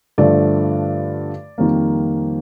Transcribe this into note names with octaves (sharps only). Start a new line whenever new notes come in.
G2 D3 F3 A3 D5
F2 D#3 G3 A#3